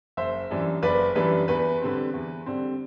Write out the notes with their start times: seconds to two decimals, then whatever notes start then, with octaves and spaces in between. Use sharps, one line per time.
0.17 F#1 C5 E5
0.50 F#2 E3 G3 D4
0.83 F#1 B4 D5
1.15 F#2 E3 G3 D4 B4
1.48 E2 B4
1.82 D3 G3 C4
2.14 E2
2.46 D3 G3 C4